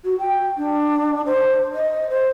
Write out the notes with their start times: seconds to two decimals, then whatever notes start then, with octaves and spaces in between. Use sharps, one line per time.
0.05 F#4
0.19 G5
0.57 D4
1.26 C5
1.74 D#5
2.10 C5